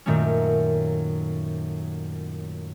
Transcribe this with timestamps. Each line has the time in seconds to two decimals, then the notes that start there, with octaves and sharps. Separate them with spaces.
0.06 F#2 A#2 D#3 A3 A#3 C#4